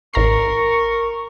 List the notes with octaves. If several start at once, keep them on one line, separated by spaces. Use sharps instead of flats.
A1 A#4 A#5 C#6 C7